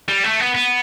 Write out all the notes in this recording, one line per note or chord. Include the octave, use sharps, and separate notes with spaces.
G3
A3
B3
B3